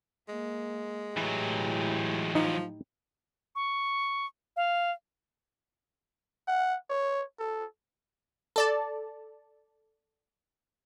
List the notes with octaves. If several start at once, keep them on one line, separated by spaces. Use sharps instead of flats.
G#3 A#3
A2 E3 F#3 E4 G4
F3 D#4
C#6
F5
F#5
C#5
A4
A4 D5 A5